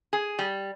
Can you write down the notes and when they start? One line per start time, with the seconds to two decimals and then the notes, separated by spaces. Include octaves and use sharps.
0.13 G#4
0.39 G3